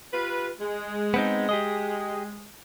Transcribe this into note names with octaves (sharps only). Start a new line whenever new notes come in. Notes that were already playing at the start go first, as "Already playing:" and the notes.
F4 G4 B4
G#3
B3 C4 D#4
G4 G#4 D#5